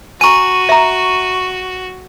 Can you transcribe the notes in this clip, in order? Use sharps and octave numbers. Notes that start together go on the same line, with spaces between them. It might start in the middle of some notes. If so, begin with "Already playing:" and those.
F#4 G#5 A#5 C#6 D#7
E5 A#5